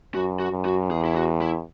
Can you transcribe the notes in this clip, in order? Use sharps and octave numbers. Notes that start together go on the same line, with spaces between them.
F#2 F#4
F#4
F#2
F#4
E2 G#4
E4
F#4
E4